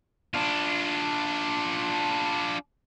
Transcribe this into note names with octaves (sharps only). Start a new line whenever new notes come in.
D4 F4